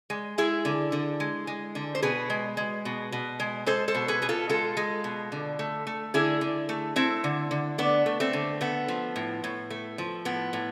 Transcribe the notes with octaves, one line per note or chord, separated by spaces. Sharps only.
G#3
G#3 E4 G#4
D3
D3
G#3
G#3
D3
C5
B2 G#4 B4
G#3
G#3
B2
B2
G#3
G#3 A4 C5
A4 C5
B2
G#4 B4
B2 G#4
F4 A4
G#3 F4 A4
G#3
B2
D3
A3
A3
D3 E4 G#4
D3
A3
A3 C4 E4
D3
D3
A3 B3 D4
A3
A3 C4
D3
A3 B3
F3
A2
A2
A3
F3
A2 B3
A2